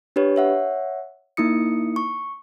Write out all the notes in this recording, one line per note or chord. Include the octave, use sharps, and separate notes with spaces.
D4 G4 B4 C#5
C#5 E5 F#5
A#3 D#4 E4 D#6 C#7
C#6